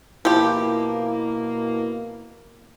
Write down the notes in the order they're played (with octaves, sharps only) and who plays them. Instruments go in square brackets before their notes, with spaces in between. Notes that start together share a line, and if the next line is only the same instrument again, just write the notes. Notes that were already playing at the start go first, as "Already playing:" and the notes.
[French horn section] B2 A#3 [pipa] F3 G4 [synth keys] E4